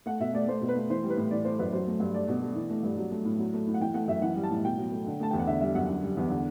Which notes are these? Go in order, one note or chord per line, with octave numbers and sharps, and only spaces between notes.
A3 F#5
B2 E5
A3 D5
A3 C5
B2
B4
A3
E3 C5
G3
B4
A2
E3 D5
A3 C5
F#2 B4
F#3 C5
A3
G2
A3 D5
B2
A3
E3
A3
G2
F#3
A3
A2
F#3
A3
A2
F#5
E3 G5
A3 F#5
F#2 E5
E3 F#5
G3
A5
A2
B2 G5
F#3
A3
D3
A3 A5
E2 G5
F#5
D3 E5
G3 E5
F#2 F#5
D3
G3
E2
D3